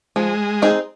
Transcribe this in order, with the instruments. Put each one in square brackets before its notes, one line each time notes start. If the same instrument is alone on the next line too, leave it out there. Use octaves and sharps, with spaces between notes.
[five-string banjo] F3 [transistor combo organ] G#3
[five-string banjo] C4 D#4 G#4